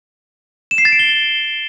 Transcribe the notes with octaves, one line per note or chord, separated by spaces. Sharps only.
E7
C7
A6
D7
G7